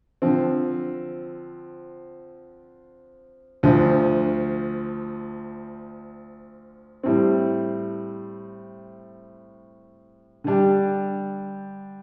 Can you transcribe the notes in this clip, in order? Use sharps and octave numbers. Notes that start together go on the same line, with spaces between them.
D3 F3 C4
D2 D3 F3
A2 G3 C4
D3 G3 D4 G4